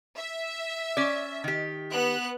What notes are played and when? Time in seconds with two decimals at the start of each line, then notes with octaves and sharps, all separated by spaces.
0.17 E5
0.97 C#4 D5
1.44 D#3 G4
1.93 B3 F#6